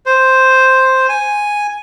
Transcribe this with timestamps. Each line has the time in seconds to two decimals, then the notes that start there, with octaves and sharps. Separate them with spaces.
0.06 C5
1.09 G#5